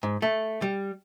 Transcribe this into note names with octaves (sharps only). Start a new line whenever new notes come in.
G#2
A3
G3